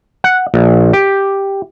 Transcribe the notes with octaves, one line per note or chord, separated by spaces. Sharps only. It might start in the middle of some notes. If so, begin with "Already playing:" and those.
F#5
A#1
G4